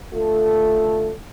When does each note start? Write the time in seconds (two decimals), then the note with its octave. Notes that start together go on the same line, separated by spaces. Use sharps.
0.14 D3 A3 F4 A4